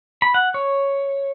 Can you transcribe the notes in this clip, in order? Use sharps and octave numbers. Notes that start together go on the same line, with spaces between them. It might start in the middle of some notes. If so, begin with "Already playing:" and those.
B5
F#5
C#5